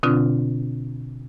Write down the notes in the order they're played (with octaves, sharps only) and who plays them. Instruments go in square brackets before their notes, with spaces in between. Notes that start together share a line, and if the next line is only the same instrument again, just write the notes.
[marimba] B2 D3 C4 D4 F4